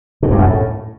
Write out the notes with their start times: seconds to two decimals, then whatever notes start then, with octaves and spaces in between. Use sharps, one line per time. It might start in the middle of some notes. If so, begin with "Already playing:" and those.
0.23 B2
0.30 G2
0.38 F#2
0.46 A2